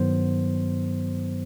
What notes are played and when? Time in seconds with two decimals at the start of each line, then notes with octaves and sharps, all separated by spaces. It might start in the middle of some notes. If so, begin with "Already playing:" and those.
Already playing: G2 D#3 F#3 B3 C5